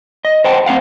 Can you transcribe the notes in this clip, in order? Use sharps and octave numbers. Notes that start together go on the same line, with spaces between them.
D#5
C5 F#5 G5 A5
C4 C#4 F5 F#5